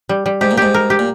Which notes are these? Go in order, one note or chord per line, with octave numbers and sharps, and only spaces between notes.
G3
G3
G#2 G4
A#2
G#2 G4
A#4
G4
A#2